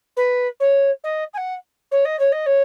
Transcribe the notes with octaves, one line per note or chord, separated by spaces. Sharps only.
B4
C#5
D#5
G#5
F#5
C#5
D#5
C#5
D#5
C#5